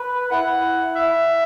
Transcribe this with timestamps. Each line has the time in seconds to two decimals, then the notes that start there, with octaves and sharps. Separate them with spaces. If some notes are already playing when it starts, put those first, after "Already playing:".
Already playing: B4
0.31 E4 F#5
0.95 E5